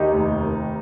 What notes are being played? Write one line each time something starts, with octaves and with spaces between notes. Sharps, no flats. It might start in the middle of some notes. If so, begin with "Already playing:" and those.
Already playing: D#2 D#4 G4
F1
D#3